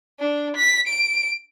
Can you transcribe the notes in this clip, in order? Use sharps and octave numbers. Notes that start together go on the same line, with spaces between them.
D4
B6
D7